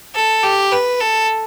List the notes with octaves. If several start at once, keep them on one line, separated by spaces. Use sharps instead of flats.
A4
G4
B4
A4